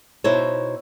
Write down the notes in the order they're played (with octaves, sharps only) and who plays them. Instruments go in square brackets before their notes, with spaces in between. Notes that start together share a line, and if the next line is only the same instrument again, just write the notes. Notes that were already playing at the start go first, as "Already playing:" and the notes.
[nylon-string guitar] B2 D#4 E4 C5 C#5